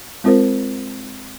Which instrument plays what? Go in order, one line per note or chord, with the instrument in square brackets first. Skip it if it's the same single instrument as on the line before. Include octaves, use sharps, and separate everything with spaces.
[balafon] G#3 C4 F4 A#4 C5